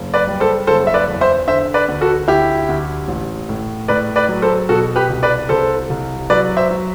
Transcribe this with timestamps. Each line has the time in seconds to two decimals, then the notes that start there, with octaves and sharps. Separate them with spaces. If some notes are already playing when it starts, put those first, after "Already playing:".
Already playing: F#1
0.14 B4 D5
0.27 G3
0.40 A4 C5
0.67 F#1 A4 C5
0.87 E5
0.94 B4 D5
1.07 E2
1.21 C5 E5
1.47 D3 C5 E5
1.74 B4 D5
1.88 D2
2.01 F#4 A4
2.28 D2 E4 G4
2.69 D2
3.08 A1
3.49 A2
3.88 A2 B4 D5
4.16 B4 D5
4.29 F#3
4.42 A4 C5
4.69 B2 F#4 A4
4.96 G4 B4
5.09 C2
5.23 B4 D5
5.49 C2 A4 C5
5.90 C2
6.30 F#3 B4 D5
6.57 C5 E5
6.71 F#3